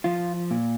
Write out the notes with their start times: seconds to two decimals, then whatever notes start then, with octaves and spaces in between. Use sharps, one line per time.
0.04 F3 F4
0.51 A#2